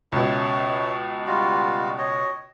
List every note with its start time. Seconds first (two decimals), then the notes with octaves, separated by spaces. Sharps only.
0.12 C#2 B2 C#5 E5
1.27 G3 F4 F#4
1.98 C#5 D#5